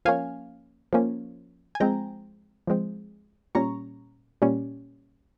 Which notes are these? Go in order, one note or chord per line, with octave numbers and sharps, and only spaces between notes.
F3 A#3 C#4 F5 G#5
F3 A#3 C#4
G#5
F3 G#3 C4 G5 A#5
F3 G#3 C4
A#2 G3 C#4 A#5 C#6
A#2 G3 C#4